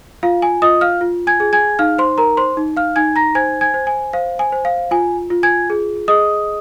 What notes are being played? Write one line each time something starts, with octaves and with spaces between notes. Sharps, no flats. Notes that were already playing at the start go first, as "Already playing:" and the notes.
F4 F5
G#5
F4 D#5 D#6
F5 F6
F4
G#5 G#6
G#4
G#5 G#6
D#4 F5 F6
C5 C6
A#4 A#5
C5 C6
D#4
F5 F6
D#4 G#5 G#6
A#5 A#6
C5 G#5 G#6
G#5 G#6
C5
G#5
C5 F5
G#5
C5
F5
F4 G#5
F4
G#5 G#6
G#4
G#4 D#5 D#6